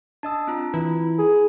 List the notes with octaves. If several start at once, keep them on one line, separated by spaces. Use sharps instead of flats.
D4 D#5 A5 D#6 E6
C4 F4 A#5
E3 E4
G#4